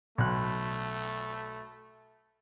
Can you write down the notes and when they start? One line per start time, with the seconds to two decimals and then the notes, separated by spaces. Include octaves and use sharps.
0.18 B1 A3 F#6